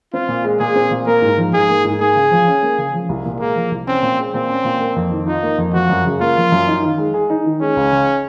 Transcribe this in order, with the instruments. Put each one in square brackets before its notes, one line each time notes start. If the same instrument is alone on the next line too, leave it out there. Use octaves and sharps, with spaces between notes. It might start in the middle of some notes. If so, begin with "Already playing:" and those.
[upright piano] C4 [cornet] F4
[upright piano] A#2
G#3
[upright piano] A#2 [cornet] G#4
[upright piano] C4
A#2
[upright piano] A#3 [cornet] A#4
[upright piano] G#2
F3
[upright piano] G#2 [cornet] G#4
[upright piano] A#3
G#2
[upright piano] A#3 [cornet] G#4
[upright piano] C#3
F3
C#4
A#3
C#3
F3
C2
A#2
[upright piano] G#3 [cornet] A#3
[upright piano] F3
C2
[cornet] C4 [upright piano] C#4
[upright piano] A#2
G#3
[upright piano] A#2 [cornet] C4
[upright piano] C#4
A#2
A#3
F2
D#3
[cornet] D#4 [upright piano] F4
[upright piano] A#3
F2
[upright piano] F3 [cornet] F#4
[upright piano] F#2
C#3
[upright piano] A#3 [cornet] F4
[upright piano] F3
F#2
D#4
D#3
G#3
G#4
D#4
D#3
[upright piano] G#3 [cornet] C#4
[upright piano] C#2
C#3